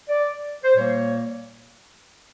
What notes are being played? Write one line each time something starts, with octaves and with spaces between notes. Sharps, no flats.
D5
C5
A#2 G3 A#3 C#5